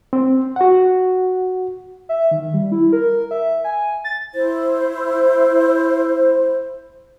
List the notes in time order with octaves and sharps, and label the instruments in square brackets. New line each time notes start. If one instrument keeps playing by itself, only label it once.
[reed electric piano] C4
F#4 F#5
[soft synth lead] E5
D#3
G3
E4
A#4
E5
G#5
A6
[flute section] E4 C5